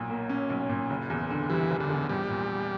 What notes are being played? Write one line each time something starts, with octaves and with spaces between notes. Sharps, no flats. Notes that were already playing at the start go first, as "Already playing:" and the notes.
Already playing: B1 A#2
A#3
C#4
B1
A#2
F#1
E2
D3
E3 G3
F#1
D3
E2
A#1 G3
A#2